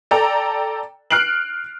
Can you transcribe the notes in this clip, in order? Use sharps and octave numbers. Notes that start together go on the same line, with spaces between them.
A4 D5 G5 A#5
F6 F#6 C7 D7 F#7